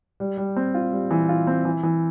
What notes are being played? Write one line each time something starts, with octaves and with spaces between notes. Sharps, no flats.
G3
G3
C4
F4
G3
E3
F4
C4
E3
E3